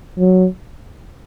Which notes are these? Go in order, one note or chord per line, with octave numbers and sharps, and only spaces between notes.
F#3